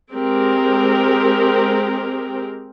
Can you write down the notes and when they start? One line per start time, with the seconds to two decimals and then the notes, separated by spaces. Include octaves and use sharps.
0.14 G#3 C4 G4 A#4